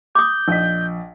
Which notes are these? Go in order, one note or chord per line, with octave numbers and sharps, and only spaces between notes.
D6 D#6 G6
A#1 D#5 B6